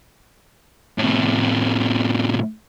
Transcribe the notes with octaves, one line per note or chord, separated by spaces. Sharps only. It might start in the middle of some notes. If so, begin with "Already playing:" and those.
A2 C3